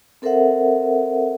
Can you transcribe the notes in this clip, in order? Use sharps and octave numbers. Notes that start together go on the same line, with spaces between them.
C4 A4 A#4 C5 E5 F#5